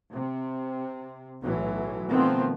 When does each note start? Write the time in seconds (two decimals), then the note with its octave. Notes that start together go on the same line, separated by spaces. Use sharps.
0.10 C3
1.41 B1 A2 E3 F#3
2.09 B2 D#3 F3 A3 B3 C4